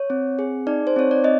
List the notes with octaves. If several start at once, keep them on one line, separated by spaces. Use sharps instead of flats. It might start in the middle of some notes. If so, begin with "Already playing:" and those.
Already playing: C#5
C4
G#4
D#4 D5
C5
C4 C#5
D5
C4 D#5